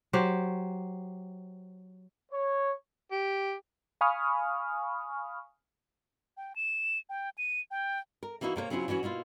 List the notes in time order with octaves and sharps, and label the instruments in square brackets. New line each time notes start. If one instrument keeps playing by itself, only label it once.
[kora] F#3 G4 C5
[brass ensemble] C#5
[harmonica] G4
[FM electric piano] F5 G#5 B5 C#6 D#6 F6
[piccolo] G5
E7
G5
D#7
G5
[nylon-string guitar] A#4
E3 A#3 D#4 E4 F#4
C3 A#3 B4 C#5
C#3 F#3 C4 C#4 E4 F4
E3 F#3 C#4 F#4
B2 A#3 E4 F4